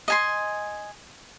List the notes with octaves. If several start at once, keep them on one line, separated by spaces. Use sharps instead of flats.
D#5 G#5 C6